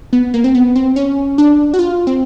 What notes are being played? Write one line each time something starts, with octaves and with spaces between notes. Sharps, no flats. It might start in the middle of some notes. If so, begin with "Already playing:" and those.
B3
A#3
C4
B3
C4
C#4
D4
F#4
F4
C4